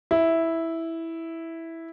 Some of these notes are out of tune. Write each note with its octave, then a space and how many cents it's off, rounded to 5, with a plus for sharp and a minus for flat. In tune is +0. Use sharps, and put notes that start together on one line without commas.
E4 -5